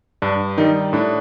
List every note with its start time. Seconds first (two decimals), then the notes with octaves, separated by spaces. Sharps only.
0.22 G2 D4
0.58 D#3 G3 D#4
0.93 A2 D4